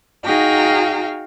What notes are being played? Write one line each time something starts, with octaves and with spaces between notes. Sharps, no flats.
D#4 F#4 G#4 F5 G5 A#5